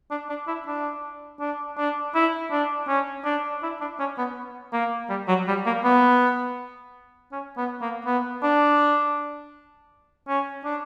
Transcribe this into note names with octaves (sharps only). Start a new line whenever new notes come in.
D4
D4
E4
D4
D4
D4
E4
D4
C#4
D4
E4
D4
C#4
B3
A#3
G3
F#3
G3
A#3
B3
C#4
B3
A#3
B3
D4
C#4
D4